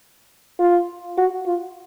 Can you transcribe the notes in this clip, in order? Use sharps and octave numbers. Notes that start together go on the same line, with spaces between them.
F4
F#4
F4